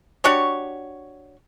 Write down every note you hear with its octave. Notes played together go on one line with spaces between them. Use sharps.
D4 F#4 G4 C#5